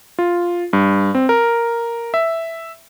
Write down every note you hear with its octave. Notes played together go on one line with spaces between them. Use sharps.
F4
G2
C4
A#4
E5